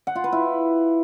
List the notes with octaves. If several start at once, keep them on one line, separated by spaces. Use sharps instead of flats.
F#5
F4
B4
E4